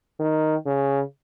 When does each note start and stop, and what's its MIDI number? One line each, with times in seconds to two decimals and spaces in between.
0.20 0.55 51
0.66 1.01 49